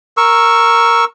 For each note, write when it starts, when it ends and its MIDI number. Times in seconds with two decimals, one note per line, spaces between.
0.17 1.05 70
0.17 1.05 85
0.17 1.05 88